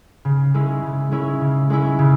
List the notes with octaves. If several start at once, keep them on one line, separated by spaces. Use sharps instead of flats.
C#3
G#3 C#4 E4
C#3
G#3 C#4 E4
C#3
G#3 C#4 E4
C#3